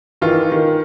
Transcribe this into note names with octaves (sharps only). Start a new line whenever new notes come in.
D#3 E3 F4
D#3